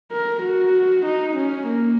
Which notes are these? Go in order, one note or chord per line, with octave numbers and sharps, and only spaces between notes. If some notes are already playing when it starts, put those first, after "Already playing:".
A#4
F#4
D#4
C#4
A#3